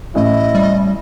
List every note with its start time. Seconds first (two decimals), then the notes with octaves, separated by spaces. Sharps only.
0.15 A1 E4 D#5
0.55 G3